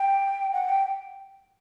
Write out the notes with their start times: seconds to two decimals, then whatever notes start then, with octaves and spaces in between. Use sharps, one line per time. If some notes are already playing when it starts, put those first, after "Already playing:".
Already playing: G5
0.53 F#5
0.69 G5